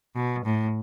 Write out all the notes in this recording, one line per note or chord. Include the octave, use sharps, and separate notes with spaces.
B2
A2